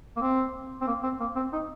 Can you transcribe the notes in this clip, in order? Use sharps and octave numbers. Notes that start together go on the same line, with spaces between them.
A#3
C4
C4
A#3
C4
A#3
C4
D#4